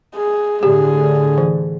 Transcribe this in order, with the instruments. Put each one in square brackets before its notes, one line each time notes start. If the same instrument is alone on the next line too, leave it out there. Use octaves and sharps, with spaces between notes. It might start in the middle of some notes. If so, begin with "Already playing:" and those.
[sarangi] G#4
[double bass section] A2 D3 [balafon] G4 [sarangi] G#4
[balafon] E3